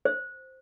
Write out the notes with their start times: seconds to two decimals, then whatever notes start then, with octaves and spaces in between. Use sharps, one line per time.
0.05 C5